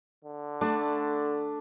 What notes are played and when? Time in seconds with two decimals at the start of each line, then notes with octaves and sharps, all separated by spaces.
0.24 D3
0.61 A3 D4